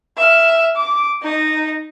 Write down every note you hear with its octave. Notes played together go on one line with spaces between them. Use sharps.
E5 F6
D6
D#4 D#5